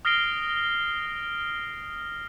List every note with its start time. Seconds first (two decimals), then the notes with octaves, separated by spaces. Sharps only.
0.05 D#6 F6 A#6 C7 D7 G7